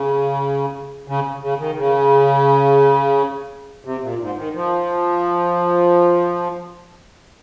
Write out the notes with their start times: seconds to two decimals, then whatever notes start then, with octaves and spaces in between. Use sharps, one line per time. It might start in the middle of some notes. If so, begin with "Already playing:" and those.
Already playing: C#3
1.08 C#3
1.42 C#3
1.59 D#3
1.77 C#3
3.85 C3
4.02 A#2
4.20 G#2
4.37 D#3
4.54 F3